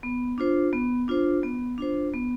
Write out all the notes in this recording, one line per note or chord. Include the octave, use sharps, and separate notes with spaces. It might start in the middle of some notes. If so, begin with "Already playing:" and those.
B3
D4 F4 C5
B3
D4 F4 C5
B3
D4 F4 C5
B3